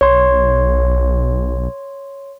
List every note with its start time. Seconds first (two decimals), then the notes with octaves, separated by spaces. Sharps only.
0.01 B1 C#5 C6